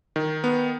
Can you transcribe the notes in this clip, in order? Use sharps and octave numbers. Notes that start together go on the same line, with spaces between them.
D#3
B3